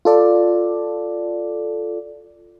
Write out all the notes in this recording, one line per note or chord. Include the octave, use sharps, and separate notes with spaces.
F4 A4 D5